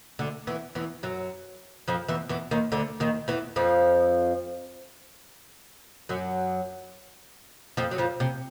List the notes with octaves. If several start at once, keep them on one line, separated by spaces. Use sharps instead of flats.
D2 D3
E2 E3
E2 E3
F#2 F#3
F2 F3
E2 E3
E2 E3
D#2 D#3
D2 D3
D#2 D#3
E2 E3
F2 F3
F#2 F#3
F2 F3
F#3
F2 F3
C3